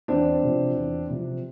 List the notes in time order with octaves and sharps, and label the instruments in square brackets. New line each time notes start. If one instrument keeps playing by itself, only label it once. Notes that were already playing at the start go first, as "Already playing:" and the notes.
[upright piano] E2 C4 D4
C3 F3
E2
C3 F3